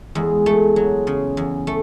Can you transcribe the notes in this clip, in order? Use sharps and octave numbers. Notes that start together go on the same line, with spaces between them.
E2 G#3
A3
F#3
C#3
E2
A3